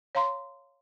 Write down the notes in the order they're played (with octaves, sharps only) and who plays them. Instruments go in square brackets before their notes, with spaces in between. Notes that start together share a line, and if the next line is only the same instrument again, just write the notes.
[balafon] C#5 F5 A#5 C6